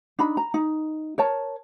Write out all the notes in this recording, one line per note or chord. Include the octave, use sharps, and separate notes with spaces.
D4 D#4 B5
A#5
D#4
A#4 C#5 A5